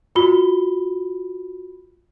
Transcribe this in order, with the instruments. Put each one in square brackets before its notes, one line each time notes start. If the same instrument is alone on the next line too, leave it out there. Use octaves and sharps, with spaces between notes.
[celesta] F4 F#4 B5 G7